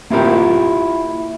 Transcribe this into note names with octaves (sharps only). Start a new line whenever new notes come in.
A#3 E4 F4 G4 A#4 G5